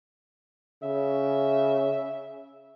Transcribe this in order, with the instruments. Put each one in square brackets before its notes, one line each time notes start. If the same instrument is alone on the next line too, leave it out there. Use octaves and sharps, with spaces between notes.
[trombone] C#3 [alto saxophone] E5